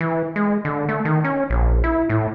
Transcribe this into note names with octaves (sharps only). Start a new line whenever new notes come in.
E3
G#3
D3
A3
D#3
C#4
A#1
E4
A2